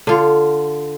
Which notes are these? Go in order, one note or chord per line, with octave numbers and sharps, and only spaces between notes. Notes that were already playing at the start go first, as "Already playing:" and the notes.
D3 F4